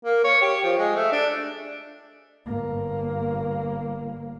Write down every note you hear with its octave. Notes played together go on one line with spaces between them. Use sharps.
A#3
C#5
G4
F3
G#3
A3
D4
G1 A#3